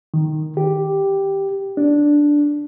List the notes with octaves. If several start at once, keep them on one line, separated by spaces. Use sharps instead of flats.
D#3
G4
D4